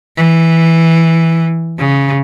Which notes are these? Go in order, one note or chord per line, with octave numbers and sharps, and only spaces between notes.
E3
C#3